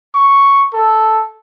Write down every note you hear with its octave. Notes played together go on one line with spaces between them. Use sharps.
C#6
A4